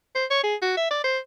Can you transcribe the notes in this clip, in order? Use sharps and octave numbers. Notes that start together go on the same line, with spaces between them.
C5
C#5
G#4
F#4
E5
D5
C5